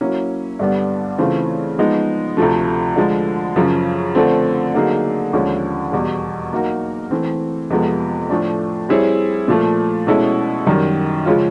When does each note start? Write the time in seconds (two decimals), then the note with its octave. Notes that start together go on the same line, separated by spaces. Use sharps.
0.01 F#3 A#3 C#4 E4
0.59 G2 D3 G3 B3 D4
1.18 C#3 E3 A3 C4 F4
1.79 F3 G#3 B3 D#4
2.37 D2 C3 F3 A3
2.96 D3 F3 G#3
3.56 F#2 C#3 F3
4.15 D3 F3 A3 C4
4.74 D3 F#3 A#3 D#4 G#4
5.33 D#2 D3 F3 G#3 C#4
5.92 E2 B2 G3
6.53 F#3 A#3 D#4 F#4 A#4
7.11 E3 A3 C4
7.70 F2 C3 F3 G#3 B3
8.30 A2 F3 A3 D4
8.89 G3 C4 E4 G#4 C#5
9.48 A#2 F3 A3
10.07 B2 G#3 C#4 E4 A4
10.67 F#2 D#3 G3
11.26 C#3 F3 G#3 C#4 F4